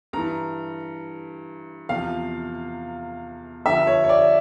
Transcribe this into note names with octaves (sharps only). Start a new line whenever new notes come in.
G2 E3 A#5
E2 C3 F3 F5
G2 D3 F3 E5
C#5
C#5
D5